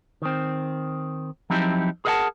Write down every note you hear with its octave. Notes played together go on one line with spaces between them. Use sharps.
D#3 C4
F3 F#3 C4 D#4 E4 G4
G#4 A#4 D#5 F5 F#5 A5